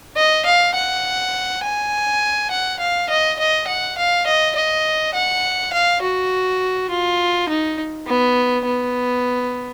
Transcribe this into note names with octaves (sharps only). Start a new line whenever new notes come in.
D#5
F5
F#5
G#5
F#5
F5
D#5
D#5
F#5
F5
D#5
D#5
F#5
F5
F#4
F4
D#4
B3
B3